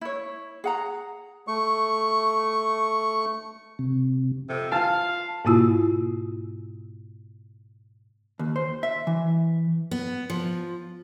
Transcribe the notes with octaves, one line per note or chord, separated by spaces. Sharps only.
E4 C#5
G#4 F#5 A#5
A3 C#6
C3
F2 C3 A4
F4 F5 A5
G#2 B2 A#3 E4 F4 E6
D#2
C5
E5
E3
B3
F3